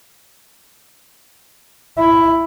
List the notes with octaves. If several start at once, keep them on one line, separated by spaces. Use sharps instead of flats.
E4